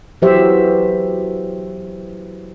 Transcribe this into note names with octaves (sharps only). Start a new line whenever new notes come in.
E3 F#3 G4 C5 E5